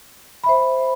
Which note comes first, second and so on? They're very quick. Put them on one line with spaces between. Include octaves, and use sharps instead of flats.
B5 E5 C5